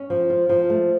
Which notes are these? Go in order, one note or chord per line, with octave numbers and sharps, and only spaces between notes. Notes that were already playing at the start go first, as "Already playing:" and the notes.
Already playing: C#4
F3
F4
F3
A3